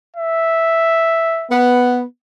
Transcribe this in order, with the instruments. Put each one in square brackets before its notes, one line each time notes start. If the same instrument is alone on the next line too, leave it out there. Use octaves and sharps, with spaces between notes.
[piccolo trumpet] E5
[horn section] B3